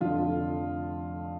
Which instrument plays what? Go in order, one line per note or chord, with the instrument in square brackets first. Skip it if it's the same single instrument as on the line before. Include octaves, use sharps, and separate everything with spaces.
[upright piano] F1 F2 D3 F4